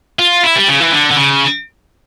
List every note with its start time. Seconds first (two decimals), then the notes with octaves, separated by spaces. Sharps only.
0.19 F4
0.43 E4
0.55 G3
0.68 C#3
0.80 E3
0.92 D3
1.11 D3
1.17 C#3